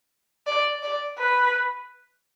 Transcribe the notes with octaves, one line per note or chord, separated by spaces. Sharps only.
D5
D5
B4